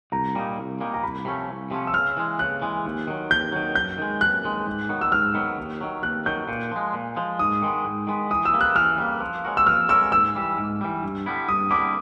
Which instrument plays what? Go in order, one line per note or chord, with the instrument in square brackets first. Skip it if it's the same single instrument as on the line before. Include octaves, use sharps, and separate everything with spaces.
[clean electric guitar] C2 [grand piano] A#5
[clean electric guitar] A#2 G3 A#3 D#4
C2
A#2 G3 A#3 D#4
[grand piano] A#5
[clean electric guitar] C2 [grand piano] B5
[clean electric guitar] C3 F3 A3 C#4
C2
C3 F3 A3 C#4
[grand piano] E6
[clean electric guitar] C#3 [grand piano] F6
[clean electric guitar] E3 G#3
[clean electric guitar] C#3 [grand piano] F#6
[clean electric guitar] E3 G#3
D#2
D#3 F#3
[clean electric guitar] D#2 [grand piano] G6
[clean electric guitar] D#3 F#3
[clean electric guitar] F#2 [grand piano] G6
[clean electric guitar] D#3 G#3
[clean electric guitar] F#2 [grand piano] F#6
[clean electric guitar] D#3 G#3
G#2
D#3 F#3 B3
[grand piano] E6
[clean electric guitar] G#2 [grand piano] F6
[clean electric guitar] D#3 F#3 B3
D#2
D#3 F#3
[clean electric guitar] D#2 [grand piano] F#6
[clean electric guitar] D#3 F#3 [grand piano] G6
[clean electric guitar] A#2
F3 G#3
A#2
F3 G#3
[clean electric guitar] G#2 [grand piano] D#6
[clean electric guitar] D#3 G#3 B3
G#2
D#3 G#3 B3
[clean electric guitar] E3 [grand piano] D#6
[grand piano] E6
[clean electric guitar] G3 A#3
[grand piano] F#6
[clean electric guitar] E3 [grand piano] F6
[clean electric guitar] G3 A#3
F3
G#3 C#4 F#4 A#4
[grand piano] E6
[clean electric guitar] F3 [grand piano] F6
[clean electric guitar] G#3 C#4 F#4 A#4 [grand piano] E6
[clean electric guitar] G#2 [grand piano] E6
[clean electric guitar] E3 G3
G#2
E3 G3
G2
D3 G3 B3 E4
[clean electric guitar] G2 [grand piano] D#6
[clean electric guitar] D3 G3 B3 E4 [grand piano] D6